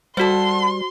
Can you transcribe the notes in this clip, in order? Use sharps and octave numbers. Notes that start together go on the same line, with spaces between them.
G3 F#4 A4 C5 F#5 C6